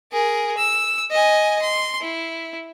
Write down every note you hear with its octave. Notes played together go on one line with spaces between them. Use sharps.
G#4 A#4
E6
D#5 G#5
C6
E4